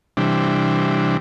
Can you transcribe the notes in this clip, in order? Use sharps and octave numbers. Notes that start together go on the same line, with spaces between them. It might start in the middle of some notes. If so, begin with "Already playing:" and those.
C3 E3 G3 D4